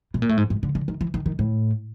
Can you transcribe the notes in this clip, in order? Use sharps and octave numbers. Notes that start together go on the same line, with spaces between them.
B2
A#2
A2
G#2
G#2
D3
D3
D#3
E3
D#3
D#3
A2